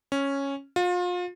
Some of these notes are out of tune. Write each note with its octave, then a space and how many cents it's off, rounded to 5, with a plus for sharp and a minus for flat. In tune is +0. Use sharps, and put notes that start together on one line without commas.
C#4 -5
F4 +35